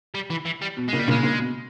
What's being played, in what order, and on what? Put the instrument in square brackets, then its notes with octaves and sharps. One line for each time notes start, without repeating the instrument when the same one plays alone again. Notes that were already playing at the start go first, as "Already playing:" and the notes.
[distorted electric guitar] G3
E3
E3
G3
[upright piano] B2
[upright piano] A#2 C#3 [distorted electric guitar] G#3
[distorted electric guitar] G3
[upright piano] A#2 C#3
[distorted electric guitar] G#3
[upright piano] A#2 C#3
B2